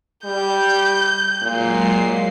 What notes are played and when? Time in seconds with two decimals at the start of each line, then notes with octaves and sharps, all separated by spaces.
0.25 G3 G6
1.42 A#2 F#3 G#3 C7